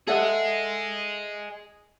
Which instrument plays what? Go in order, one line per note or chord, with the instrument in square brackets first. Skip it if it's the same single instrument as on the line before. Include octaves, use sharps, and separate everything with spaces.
[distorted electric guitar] G#4 D#5 [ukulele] A4 E5 F#5